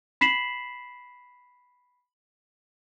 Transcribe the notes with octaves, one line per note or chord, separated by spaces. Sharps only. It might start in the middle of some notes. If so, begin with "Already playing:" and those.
B5 B6 C7 E7 F#7